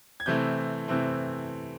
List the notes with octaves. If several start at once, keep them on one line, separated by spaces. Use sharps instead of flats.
G#6
C3 E3 A3 C4 G6
C3 E3 A3 C4